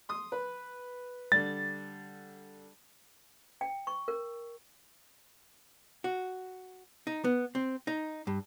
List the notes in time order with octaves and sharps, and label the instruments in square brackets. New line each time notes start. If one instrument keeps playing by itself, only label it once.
[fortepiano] C6 D#6
B4
[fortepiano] D3 G3 [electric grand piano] A6
[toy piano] G5
C#6
A#4
[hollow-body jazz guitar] F#4
D#4
B3
C4
D#4
G2